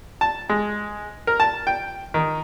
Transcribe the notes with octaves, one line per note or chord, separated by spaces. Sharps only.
A5
G#3
A#4
A5
G5
D#3